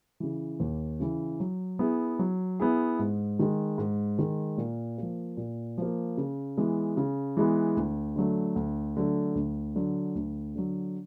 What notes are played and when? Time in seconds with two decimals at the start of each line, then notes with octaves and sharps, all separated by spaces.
0.20 C#3 E3
0.60 D#2
1.00 C#3 E3
1.40 F#3
1.79 B3 E4 G#4
2.19 F#3
2.60 B3 E4 G#4
2.99 G#2
3.39 D#3 G#3
3.78 G#2
4.19 D#3 G#3
4.58 A#2
4.98 F3 A#3
5.37 A#2
5.78 F3 A#3
6.17 C#3
6.58 E3 G#3 B3
6.97 C#3
7.37 E3 G#3 B3
7.77 D2
8.16 D3 F#3 A3
8.56 D2
8.97 D3 F#3 A3
9.35 D2
9.76 D3 F#3
10.15 D2
10.56 D3 F#3